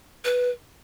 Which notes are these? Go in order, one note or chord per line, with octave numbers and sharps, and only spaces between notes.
B4